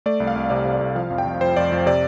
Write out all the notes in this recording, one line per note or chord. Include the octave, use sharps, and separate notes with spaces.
A3 D5
C2
F5
C2
C3 D5
C3
D5
C2
F3 F5
F2
G5
F2
F2 C5
F2 D5
F2
C3 D5